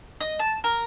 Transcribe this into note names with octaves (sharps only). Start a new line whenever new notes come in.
D#5
A5
A#4